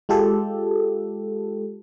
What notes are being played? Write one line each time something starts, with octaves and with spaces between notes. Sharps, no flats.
G#3 F4 G4 A4